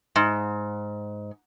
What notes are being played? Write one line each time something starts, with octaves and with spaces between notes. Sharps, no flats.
G#2